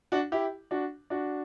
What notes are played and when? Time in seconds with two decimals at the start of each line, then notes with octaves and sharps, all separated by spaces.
0.12 D4 F#4
0.32 E4 G4
0.71 D4 F#4
1.10 D4 F#4